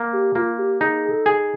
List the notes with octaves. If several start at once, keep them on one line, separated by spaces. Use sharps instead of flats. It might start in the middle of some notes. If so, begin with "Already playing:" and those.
Already playing: A#3
G4
A#3 F4
G4
D#4 G#4
G#4
A4
G#4